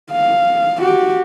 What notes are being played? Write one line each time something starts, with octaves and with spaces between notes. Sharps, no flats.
F5
F#4 G4